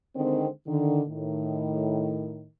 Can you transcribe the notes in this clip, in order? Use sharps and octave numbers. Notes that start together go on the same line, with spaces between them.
D3 D#3 G#3 C4
D3 D#3
A2 D#3